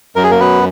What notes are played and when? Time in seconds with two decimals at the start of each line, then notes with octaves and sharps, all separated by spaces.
0.16 F#2 A#4
0.23 G#4
0.31 A#3 A#4
0.40 F#3 B3 B4